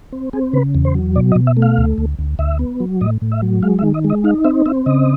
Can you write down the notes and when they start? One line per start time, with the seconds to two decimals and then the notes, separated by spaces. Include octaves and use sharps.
0.12 C4
0.33 C4 G#4
0.53 C#3 B4
0.75 E2
0.85 C5
0.95 F#3
1.16 B2 D5
1.32 D#5
1.36 B2
1.47 E5
1.57 A3
1.62 F5
1.78 D2
1.98 D2
2.19 D2
2.39 D2 E5
2.59 B3
2.80 F#3
3.01 A2 D#5
3.22 A2
3.32 E5
3.42 F#3
3.63 G#3 F5
3.79 E5
3.83 D#3
3.94 D#5
4.04 G#3
4.10 D#5
4.24 D#4 F5
4.44 C4 E5
4.66 C4 E5
4.86 C#3 D#5